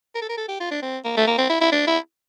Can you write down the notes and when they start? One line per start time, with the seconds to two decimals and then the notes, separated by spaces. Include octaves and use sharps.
0.15 A#4
0.22 A4
0.29 A#4
0.38 A4
0.48 G4
0.60 F4
0.71 D4
0.82 C4
1.05 A#3
1.17 A3
1.27 A#3
1.38 C4
1.50 E4
1.61 E4
1.72 D4
1.87 E4